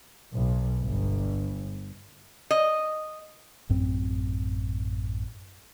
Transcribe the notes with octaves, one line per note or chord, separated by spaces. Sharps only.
B1
G1
D#5
A1 F#2 C4